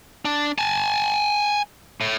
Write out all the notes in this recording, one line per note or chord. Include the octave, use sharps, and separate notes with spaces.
D4
G#5 A5
A2